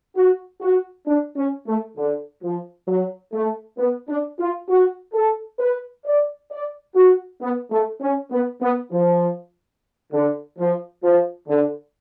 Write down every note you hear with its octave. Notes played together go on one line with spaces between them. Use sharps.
F#4
F#4
D4
C#4
A3
D3
F3
F#3
A3
B3
D4
F4
F#4
A4
B4
D5
D5
F#4
B3
A3
C#4
B3
B3
F3
D3
F3
F3
D3